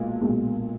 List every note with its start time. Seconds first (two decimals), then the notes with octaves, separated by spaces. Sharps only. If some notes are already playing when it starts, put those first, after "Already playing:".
Already playing: B1 A#2 G#3
0.21 B1 A#2 G#3